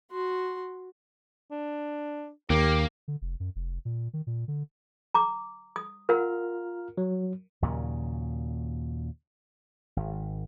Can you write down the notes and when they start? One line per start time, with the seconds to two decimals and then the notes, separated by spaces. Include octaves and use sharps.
0.11 F#4 C6
1.51 D4
2.50 D#2 A#3 G4
3.08 D3
3.22 F1
3.40 F#2
3.56 F1
3.85 A#2
4.13 D#3
4.27 A#2
4.48 D3
5.14 A#5 D6
5.76 D#6
6.09 F4 A#4 F#5 A#5 F6
6.98 F#3
7.62 D#2 A#2 C#3 F#3
9.97 G#1